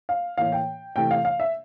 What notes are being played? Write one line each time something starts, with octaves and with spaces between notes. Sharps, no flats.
F5
A2 E3 A#3 F5
G5
C3 E3 A3 G5
F5
F5
E5